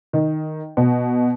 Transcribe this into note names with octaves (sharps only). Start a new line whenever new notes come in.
D#3
B2